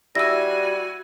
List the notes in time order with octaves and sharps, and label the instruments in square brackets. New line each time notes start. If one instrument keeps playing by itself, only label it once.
[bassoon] G3 [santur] E4 [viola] F#4 G#5 [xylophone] E6 A#6